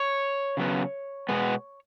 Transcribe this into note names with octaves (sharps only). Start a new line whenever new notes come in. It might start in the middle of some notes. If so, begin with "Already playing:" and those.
Already playing: C#5
C#3 F#3 B3
B2 G#3 B3